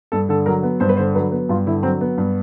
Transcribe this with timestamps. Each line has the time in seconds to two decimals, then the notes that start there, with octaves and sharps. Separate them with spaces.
0.12 G2 A4
0.29 D3 A4
0.46 F#3 A#4
0.63 B3
0.80 G2 C5
0.89 B4
0.97 D3 C5
1.15 F#3 B4
1.31 B3
1.49 G2 F4
1.66 D3 E4
1.83 F#3 C4
2.01 B3
2.18 G2